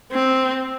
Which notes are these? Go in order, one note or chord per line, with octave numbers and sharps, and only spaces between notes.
C4